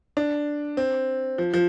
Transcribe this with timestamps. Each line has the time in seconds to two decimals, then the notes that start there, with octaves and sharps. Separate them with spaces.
0.17 D4
0.77 C4
1.38 F3
1.54 F3